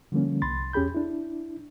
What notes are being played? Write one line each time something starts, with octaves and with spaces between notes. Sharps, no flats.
D3 F3 G3 A#3 C#4
C2 B5 C6 A6
E2 C#4 G4 G#4 B5 G6
D4 E4